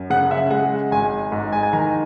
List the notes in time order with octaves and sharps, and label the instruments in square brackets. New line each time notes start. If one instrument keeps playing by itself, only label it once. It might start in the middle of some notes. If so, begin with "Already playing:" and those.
Already playing: [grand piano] F#2
C#3 F#5
E5
G#3 F#5
G#1 G#5
G#2
G#5
G#5
D#3 A#5